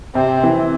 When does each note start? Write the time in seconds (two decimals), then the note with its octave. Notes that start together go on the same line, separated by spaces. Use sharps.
0.15 C3 C4
0.43 E3